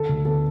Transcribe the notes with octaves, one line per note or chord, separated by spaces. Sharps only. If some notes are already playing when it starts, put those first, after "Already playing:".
Already playing: D3 A4
D2
B3 A4